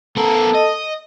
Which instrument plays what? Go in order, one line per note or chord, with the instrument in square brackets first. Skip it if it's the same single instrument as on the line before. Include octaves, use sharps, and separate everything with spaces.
[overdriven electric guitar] B3 A#4 [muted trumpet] A4
[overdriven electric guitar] D#5